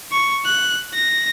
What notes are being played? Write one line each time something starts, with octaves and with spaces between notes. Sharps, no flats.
C#6
F#6
A#6